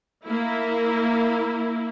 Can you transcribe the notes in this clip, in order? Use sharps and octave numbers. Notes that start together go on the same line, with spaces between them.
A#3 E4